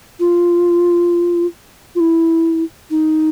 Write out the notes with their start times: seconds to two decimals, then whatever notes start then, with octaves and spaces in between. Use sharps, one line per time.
0.20 F4
1.95 F4
2.00 E4
2.91 D#4